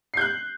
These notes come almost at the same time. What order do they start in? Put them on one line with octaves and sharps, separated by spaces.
C7 G6 F#6